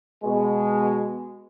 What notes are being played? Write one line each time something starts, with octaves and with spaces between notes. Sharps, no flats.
B2 G#3